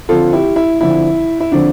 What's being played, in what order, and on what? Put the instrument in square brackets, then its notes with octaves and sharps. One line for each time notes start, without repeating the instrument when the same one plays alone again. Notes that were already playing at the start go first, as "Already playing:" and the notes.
[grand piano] D3 F3 C4 F4 A4
E4 G4
E4
D3 F3 C4 E4
E4
D3 F3 C4 D4